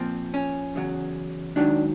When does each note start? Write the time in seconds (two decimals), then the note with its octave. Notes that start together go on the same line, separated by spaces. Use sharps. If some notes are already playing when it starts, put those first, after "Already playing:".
Already playing: A#2 F3 C4
0.34 C#4
0.75 E2 C#3 F#3
1.56 G#2 D#3 F#3 D4